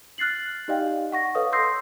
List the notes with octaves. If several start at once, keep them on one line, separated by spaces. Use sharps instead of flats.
F6 F#6 A6 C7 F#7
D#4 G4 D5 D#5 F5 G5
F#5 C#6 A#6
A4 B4 C#5 D#5 F5 D#6
C6 D#6 E6 G6 A#6 C7